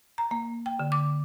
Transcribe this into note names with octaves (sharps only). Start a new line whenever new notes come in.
A#5
A#3
G5
D3
D6